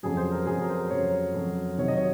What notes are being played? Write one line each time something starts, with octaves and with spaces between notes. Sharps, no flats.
F2 C#3 F#3 G#4
C5
A#4
F2 C#3 F#3 G#4
A#4
C5
A#4
F2 C#3 F#3 C#5
F2 C#3 F#3
C3 D#3 F#3 C#5
D#5
C#5